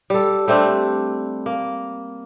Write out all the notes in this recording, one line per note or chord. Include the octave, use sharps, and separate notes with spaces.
G3 A4
G3 A3 C4 D4
A#3